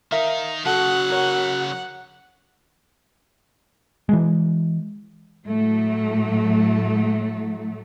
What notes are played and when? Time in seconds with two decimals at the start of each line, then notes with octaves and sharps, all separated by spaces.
0.12 D#3 D#4 A#4 E5 F5
0.65 C#3 F#3 F#4 A4 F#5
1.10 A#4 C#5
4.09 E3 G#3
5.46 A2 F#3 A3